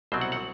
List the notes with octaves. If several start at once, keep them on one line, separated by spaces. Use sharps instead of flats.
C2 B2 F#3 C4 C5
F#5
F#5